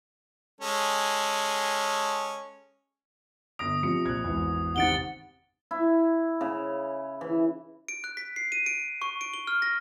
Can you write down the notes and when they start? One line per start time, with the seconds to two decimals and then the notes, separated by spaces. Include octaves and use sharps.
0.61 G#3 C#4 A4
3.59 G1 D#6 A#6 D7
3.83 C3 F3 C#7
4.05 A#1 F#6 G#6
4.24 G#1 E2
4.76 C3 D#3 C4 F#5 A6 D7 G7
5.71 E4
6.41 C#3
7.21 E3
7.88 D7
8.04 F#6
8.17 B6
8.36 C7
8.52 D#7
8.66 D7
9.02 C#6
9.21 D7
9.34 G7
9.47 F6
9.62 A#6